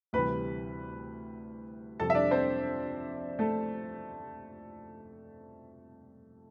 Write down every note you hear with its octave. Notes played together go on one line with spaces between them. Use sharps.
D2 C3 E3 G3 B4 B5
F2 C3 G3 A4 A5
E5
D4 D5
C4 C5
A3 A4